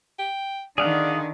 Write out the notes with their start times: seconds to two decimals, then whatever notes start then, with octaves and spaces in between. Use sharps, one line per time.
0.19 G5
0.78 D3 D#3 G#4 D5 F5 F#5